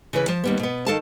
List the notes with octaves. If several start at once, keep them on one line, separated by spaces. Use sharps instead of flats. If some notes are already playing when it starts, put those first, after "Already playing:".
C#3 E3 B4
F3 A5
D#2 G3 B3
B2 B3
D#3 F3 A4 F5 A5